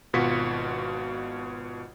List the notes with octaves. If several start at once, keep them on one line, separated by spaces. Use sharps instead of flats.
G#1 B2 F4 F#4 B6 C#7